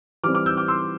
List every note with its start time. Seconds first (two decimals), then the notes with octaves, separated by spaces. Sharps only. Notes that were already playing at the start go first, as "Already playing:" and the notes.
0.23 E3 G3 C4 D6 F6
0.34 D6 F6
0.46 E6 G6
0.57 D6 F6
0.68 C6 E6